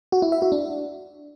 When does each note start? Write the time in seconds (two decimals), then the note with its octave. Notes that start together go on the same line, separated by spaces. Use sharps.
0.12 F#4
0.22 E4
0.32 E5
0.42 F#4
0.52 D4